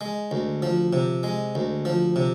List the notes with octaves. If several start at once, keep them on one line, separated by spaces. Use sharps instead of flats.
G#3
D2
F3
C3
G#3
D2
F3
C3